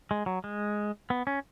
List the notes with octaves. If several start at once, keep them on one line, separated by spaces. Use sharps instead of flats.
G#3
F#3
G#3
B3
C#4